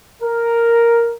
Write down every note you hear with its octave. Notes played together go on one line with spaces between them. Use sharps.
A#4